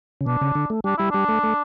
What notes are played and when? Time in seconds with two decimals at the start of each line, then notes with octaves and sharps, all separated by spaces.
0.21 C#3
0.26 B2 D4
0.41 C#3
0.55 D3
0.70 A3
0.84 G3 D4
0.98 G3 E4
1.10 G3 D4
1.29 A3
1.44 A3